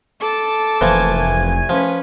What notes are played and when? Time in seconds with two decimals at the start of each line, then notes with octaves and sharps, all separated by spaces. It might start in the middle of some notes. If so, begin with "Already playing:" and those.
0.20 A4 A5 D6
0.81 F1 C2 E3 F3 A3 A#3 G#5
1.69 F3 C#4 B4